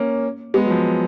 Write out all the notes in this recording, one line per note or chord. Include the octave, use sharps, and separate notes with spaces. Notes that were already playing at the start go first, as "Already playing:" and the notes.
Already playing: A#3 C#4
G#3 B3
F#3
F3